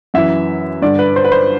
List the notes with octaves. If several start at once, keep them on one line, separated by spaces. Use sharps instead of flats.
F#2 E3 E5
G2 D3 D5
B4
C5
B4
C5